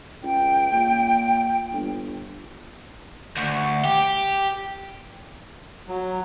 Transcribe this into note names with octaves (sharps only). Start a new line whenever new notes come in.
C#2 G5
A#2
G1
D2
G4
F#3